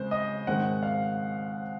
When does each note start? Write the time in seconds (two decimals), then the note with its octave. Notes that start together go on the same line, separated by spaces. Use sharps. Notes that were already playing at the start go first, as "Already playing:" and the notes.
Already playing: C#3 G#3 C4 C5
0.11 D#5
0.47 G#2 D#3 G#3 C4 F#5
0.83 F5